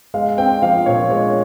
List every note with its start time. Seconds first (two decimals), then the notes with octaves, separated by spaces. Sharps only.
0.14 G#3 F5
0.38 C4 G5
0.62 F3 F5
0.86 A#2 C#5
1.10 G#3 C#5